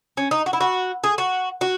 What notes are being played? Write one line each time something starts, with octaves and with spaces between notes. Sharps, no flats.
C#4
D#4
F#4
E4
F#4
G#4
F#4
F#4